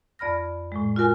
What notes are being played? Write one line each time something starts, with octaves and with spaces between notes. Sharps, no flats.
F2 D5 B5 F6 A#6
A2 G#3
F4 F#4 A#4 G#5